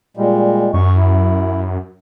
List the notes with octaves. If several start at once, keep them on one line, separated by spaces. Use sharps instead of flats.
A#2 G3 G#3
F#2 C#6
E4